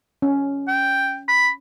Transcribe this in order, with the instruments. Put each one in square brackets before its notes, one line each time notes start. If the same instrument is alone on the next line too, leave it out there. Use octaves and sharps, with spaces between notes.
[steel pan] C#4
[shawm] G5
B5